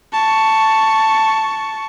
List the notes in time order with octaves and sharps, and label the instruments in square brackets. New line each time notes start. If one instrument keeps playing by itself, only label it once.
[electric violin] A5 C#6